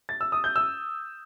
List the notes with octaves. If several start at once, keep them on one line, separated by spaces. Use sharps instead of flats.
A6
E6
D#6
G6
E6